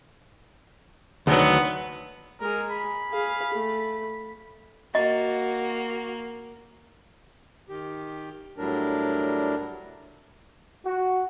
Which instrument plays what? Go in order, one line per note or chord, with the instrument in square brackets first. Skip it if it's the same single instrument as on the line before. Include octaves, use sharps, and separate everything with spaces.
[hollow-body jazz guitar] D2 D#3 F#3 [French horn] B3
[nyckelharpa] G#3 G#4 [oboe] A#4
[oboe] B5
[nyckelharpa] G#4 F5
A3
[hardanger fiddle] A#3 [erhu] F#4 [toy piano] D#5
[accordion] D#3 G4
A2 F#3 G3 D4 A#4
[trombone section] F#4